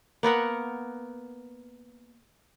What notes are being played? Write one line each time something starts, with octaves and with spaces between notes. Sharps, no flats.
A#3 B3 A#4 F#5